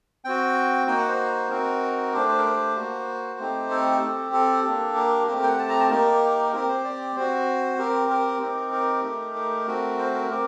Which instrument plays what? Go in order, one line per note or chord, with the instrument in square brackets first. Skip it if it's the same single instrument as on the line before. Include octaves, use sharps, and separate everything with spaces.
[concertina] C4 F#4 G5
A#3 D#4 F#4 G5
F#5
C5
C4 D#4 F#4 A#4
A3 D4 G4 C5
C5
A#4
C5
A#3 F#4
A3 C4 D#4 G4
A4
G4
C4
A4
A#3 D4 G4
A#4
A3 C4 G4 A#4
A#4
G5
F#5
A5
A#5
A5
A#3 D#4 G4 A#4
C4 G4 A#4
C5
D5
C4 F#4 C5
C4 G4 A#4
A#4
C4 D#4 G4
A#4
A3 D#4 G4
A#4
A3 C4 F#4
C5
A#4
C4 G4 A#4